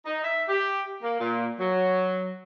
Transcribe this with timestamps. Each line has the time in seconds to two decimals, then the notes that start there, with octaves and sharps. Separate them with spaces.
0.05 D#4
0.24 E5
0.49 G4
1.02 A#3
1.20 A#2
1.59 F#3